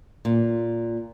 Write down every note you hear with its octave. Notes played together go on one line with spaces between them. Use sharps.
A#2